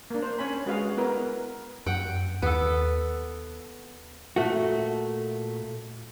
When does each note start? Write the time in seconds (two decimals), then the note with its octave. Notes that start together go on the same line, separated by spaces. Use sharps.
0.11 A#3 D4
0.22 C5
0.39 C#4 C#5 G#5 B5
0.66 G#3 F#4 G#4 B4 F5
0.97 B3 E4 A#4 B4
1.86 F#2 F#5 G5
2.42 D#2 B3 A4
4.36 A#2 A3 F#4